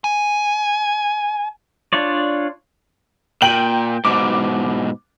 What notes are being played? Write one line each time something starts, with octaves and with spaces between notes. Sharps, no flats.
G#5
D4 F4 C#5 D5
A#2 G5 F#7
G#2 B2 D6